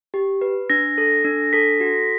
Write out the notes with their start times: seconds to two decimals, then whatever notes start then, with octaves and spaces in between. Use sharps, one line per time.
0.14 G4
0.41 B4
0.70 D4 A#6
0.98 A4
1.24 D4
1.53 A4 B6
1.80 F#4